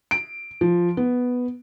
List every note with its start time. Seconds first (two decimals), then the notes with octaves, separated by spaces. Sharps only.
0.11 D7
0.61 F3
0.97 B3